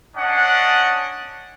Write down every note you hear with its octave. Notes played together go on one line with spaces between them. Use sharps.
C#4 D4 D#5 F#5